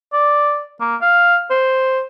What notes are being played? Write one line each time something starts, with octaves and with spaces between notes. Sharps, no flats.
D5
A#3
F5
C5